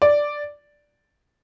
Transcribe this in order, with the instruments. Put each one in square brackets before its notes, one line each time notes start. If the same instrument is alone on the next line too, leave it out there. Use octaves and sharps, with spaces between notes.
[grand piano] D5